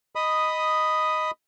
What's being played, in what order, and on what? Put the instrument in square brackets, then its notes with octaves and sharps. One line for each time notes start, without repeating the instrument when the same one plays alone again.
[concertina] D#5 B5 D#6